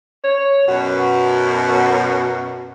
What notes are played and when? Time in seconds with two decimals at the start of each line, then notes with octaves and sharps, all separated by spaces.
0.24 C#5
0.68 F#2 B2 F#4